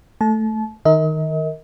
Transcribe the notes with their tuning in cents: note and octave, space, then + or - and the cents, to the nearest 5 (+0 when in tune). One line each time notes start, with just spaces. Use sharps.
A3 +0 A5 -30
D#3 +0 A#4 -10 D#5 +40